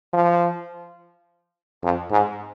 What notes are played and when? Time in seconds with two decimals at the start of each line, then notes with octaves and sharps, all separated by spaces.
0.13 F3
1.83 F2
2.11 G#2